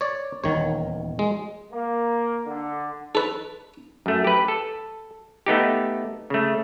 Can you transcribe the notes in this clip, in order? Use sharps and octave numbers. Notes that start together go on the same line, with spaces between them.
C#5 D5
D#1 E2 D#3 C#5
G#3
A#3
D3
A4 B4
F#2 A3
G4 B4
A4
A3 B3 D#4 G4
C#3 A3